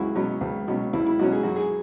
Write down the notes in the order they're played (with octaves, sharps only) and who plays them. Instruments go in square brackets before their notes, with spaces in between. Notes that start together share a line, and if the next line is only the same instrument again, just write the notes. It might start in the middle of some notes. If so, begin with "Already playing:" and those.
Already playing: [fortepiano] C#2 F#3 C#4 E4 F#4 G#4
B2 F#3 C#4
C#2
B2 F#3 C#4
C#2 E4
E4
B2 F#3 C#4 F#4
G#4
F#2 F#4
G#4